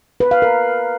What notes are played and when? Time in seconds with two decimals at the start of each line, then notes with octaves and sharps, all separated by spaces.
0.20 B4
0.31 F5
0.42 A#4